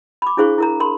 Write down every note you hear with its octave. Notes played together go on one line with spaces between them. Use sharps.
B5 D6
D4 E4 G#4 C5 F5 C#6
E4 A#4 A#5
A#4 B5 C6